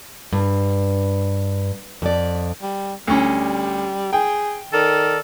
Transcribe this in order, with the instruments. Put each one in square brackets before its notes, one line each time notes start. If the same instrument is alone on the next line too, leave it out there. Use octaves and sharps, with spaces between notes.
[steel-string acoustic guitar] G2
F2 D5
[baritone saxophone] G3
[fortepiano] D2 C#4 [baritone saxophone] G3
[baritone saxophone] G#4 [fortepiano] G5
[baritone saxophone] D#3 [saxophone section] A4 A#4 D5